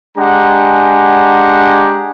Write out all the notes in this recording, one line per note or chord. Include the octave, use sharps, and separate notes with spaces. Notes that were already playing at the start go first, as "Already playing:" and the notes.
G#3 D4 G4 F#5 G#5 A#5